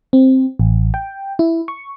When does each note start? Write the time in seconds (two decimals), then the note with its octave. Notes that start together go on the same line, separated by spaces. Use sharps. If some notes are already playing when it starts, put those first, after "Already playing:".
0.13 C4
0.59 A1
0.94 G5
1.39 E4
1.68 C#6